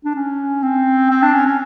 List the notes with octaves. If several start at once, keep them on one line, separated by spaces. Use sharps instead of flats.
D4
C#4
C4
C4
D4
C#4
C#4